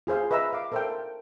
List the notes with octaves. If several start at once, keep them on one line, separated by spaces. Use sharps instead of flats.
F4 G#4 C5 F5
B4 D#5 E5 A#5 E6
F5 D6
A4 A#4 C5 E5 F5 G5